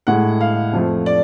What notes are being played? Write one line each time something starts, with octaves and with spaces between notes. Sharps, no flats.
A2 G#3 F#5
F5
F2 F3 A3
D5